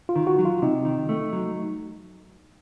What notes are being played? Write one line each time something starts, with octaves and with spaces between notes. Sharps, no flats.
F4
D#3
F#4
F#3
F4
C3 D#4
D#3
A3
F#3